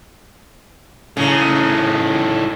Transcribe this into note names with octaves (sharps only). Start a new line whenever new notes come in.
A2 C#3 D#4